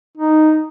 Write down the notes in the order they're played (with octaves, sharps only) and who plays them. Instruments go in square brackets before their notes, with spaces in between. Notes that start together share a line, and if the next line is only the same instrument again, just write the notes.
[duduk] D#4